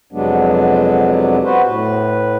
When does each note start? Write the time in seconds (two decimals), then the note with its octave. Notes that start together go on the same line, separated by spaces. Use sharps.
0.13 F2 C3 F#3 G#3 B3 D4
1.44 B3 F#4 B4 C5
1.65 A2 B4